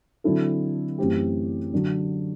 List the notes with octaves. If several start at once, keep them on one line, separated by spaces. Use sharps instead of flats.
D3 F#3 C4 E4 A4
F#2 E3 A3 C4 G4
D3 F#3